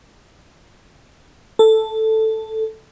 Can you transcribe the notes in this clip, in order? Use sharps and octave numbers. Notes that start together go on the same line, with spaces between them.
A4